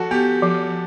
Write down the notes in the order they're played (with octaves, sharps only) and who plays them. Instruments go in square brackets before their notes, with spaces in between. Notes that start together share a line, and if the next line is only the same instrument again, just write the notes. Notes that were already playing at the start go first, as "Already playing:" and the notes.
Already playing: [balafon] F3 [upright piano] F#4 A4
[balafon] B3 [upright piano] G4
[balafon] F3